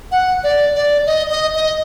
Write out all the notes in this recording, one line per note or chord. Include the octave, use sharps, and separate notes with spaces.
F#5
D5
D5
D#5
D#5
D#5